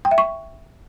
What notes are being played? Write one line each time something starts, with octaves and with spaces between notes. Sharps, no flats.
G5
E5
C#6